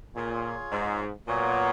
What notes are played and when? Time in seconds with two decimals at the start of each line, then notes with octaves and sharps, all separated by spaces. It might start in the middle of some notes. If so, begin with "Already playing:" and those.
0.16 A#2 F4 G#4 C#5
0.72 G#2
1.27 A#2 F#3 B3 F#4 C#5